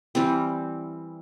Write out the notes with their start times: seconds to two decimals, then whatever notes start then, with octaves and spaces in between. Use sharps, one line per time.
0.15 E3 G3 C4